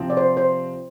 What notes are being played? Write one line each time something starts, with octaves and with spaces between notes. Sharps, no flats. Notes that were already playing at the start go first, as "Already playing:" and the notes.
Already playing: C3 F3 C4
D5
C5
C5